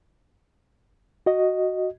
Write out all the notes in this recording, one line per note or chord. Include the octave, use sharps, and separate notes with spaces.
F#4 D#5